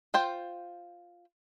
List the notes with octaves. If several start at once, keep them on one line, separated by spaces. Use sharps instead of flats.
F4 C5 G5